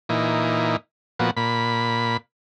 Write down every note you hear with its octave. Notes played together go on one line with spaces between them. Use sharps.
A#2 E3 D#4
A#2 F3 B3 F#4
A#2 B5